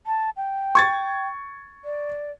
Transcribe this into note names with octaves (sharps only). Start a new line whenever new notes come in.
A5
G5
C#6 G#6 A6
D5